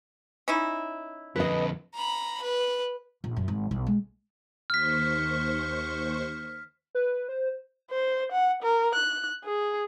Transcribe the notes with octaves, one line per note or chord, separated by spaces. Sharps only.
C#4 D#4 E4
F2 D3 B4 D#5
A#5 B5
B4
A#1
F#2
G#1
B1
G#3
D#2 C5 C#6 F6 B6
B4
C5
C5
F#5
A#4
F#6
G#4